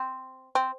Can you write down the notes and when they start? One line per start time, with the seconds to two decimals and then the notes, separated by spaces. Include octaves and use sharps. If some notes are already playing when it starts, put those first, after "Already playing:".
Already playing: C4
0.55 C4